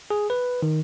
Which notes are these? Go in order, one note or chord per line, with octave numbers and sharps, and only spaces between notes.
G#4
B4
D#3